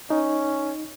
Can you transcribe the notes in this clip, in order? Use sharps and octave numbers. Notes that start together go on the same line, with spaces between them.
C#4 D#4